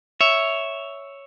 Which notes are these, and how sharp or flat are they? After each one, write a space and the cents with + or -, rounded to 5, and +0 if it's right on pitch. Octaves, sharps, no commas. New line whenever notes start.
C#5 +5 E5 +0